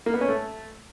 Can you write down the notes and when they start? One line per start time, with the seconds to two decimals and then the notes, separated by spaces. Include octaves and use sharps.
0.06 A#3
0.14 B3
0.21 C#4
0.28 A3